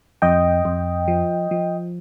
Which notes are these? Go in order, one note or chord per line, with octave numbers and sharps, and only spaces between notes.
F2 D#5 G5
F2
F3
F3